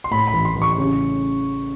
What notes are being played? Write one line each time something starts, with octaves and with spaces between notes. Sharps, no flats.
C6
A2 B5
B5
A1
C6
A1
C#6
C#3